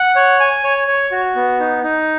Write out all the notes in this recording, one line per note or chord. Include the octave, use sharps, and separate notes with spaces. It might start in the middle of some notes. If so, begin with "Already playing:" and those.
Already playing: F#5
C#5
G#5
C#5
C#5
F#4
B3
D#4
D#4